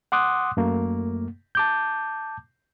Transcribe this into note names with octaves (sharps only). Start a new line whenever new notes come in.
F#5 C6 D6 D#6 F#6
F#2 A3 A#3
A5 D6 G6